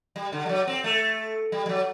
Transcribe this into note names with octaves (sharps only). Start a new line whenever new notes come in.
G3
D3
G3
F#3
C4
A3
G3
G3
F#3